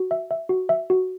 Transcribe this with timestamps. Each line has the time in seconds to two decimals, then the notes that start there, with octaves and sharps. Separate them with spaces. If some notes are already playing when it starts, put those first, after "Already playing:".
Already playing: F#4
0.11 E5
0.31 E5
0.49 F#4
0.69 E5
0.90 F#4